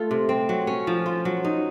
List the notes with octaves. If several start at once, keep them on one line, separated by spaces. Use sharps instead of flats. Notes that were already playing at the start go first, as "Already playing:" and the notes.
Already playing: A3 F4 A4
C3
C4
F#3
C#4
F3
F4
F#3
D#4